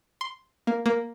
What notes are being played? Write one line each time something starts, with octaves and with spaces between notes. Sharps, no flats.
C6
A#3
A#3